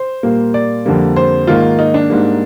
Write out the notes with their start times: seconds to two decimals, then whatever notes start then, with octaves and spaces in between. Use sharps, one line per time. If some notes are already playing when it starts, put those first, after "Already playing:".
Already playing: C5
0.23 A#2 G3 A#3
0.54 D5
0.86 F2 D3 G3 A#3
1.16 C5
1.47 G#2 D#3 A#3 F4
1.79 D#4
1.94 D4
2.10 G#2 G3 A#3